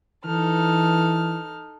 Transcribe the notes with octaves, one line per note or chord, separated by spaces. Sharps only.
E3 D#4 A4 F6